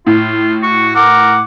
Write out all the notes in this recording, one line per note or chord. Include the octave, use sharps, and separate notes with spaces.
A2 F4
F#4 C#6
A#4 F#5 D6